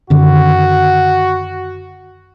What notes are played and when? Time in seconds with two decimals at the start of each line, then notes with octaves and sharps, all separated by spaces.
0.10 F#2 D3 D#3 F#4